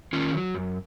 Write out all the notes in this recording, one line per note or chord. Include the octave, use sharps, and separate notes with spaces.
D#3 C#4 F4
F#3
F#2